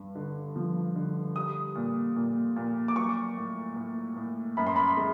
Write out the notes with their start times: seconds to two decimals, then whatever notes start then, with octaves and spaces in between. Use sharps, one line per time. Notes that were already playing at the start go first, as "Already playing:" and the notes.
Already playing: G2
0.15 D3
0.56 F3
0.96 D3
1.36 G3 D#6
1.75 A#2
2.16 A#2
2.56 A#2
2.88 D6
2.96 F#3 C#6
3.37 A2
3.76 A2
4.16 A2
4.57 F#2 B5
4.67 C6
4.76 B5
4.97 G#3